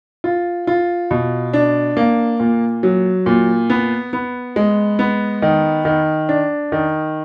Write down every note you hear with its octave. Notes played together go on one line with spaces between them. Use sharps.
F4
F4
B2
D4
A#3
A#2
F#3
A#2
B3
B3
G#3
B3
D#3
D#3
D4
D#3